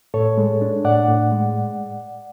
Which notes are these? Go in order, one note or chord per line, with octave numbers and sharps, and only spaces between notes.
A2 A4 C#5
G#3
D4
A2 D5 F#5
A2
G#3